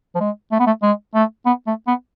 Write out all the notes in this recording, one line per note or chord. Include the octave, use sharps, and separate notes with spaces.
F3
G#3
A3
B3
A3
G#3
A3
B3
A3
B3